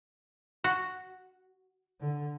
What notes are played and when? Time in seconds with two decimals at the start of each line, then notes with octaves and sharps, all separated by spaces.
0.64 F#4
2.00 D3